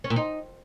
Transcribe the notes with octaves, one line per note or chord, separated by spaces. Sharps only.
C#4
A#2
D#4